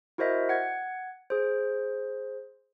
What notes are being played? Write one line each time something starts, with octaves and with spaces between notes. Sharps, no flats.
E4 F#4 A#4 C5 D#5 E5
F#5 G#6
G#4 C5